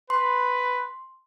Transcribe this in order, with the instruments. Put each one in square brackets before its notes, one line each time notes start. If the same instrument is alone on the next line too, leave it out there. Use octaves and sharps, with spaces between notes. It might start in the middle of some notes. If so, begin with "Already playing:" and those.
[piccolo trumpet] B4 [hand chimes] C6